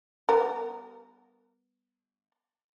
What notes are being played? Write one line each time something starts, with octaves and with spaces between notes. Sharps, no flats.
G3 B3 A#4